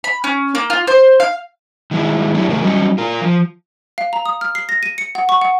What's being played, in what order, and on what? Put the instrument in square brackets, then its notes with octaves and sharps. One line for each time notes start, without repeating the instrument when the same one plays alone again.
[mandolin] B5
C#4
A#3
F4
C5
F5
[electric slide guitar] D#3 G#3 B3 E4
F#3 A3 B3 D4 E4 G4
C#3 A3 A#4
F#3 G3 C#4 D#4
F4 A#4
F3
[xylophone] F5
A#5
D#6
F6
C7
A#6
D#7
C#7
F#5
C#6
F#5